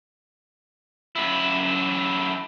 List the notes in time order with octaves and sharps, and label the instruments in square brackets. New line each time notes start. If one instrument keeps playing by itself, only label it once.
[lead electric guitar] F#2 E4